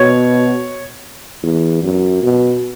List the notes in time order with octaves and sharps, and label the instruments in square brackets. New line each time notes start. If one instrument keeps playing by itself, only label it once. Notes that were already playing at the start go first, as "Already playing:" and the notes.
Already playing: [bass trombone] B2 [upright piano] C#5
[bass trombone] E2
F#2
B2